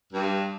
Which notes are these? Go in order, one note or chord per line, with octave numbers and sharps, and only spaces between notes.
G2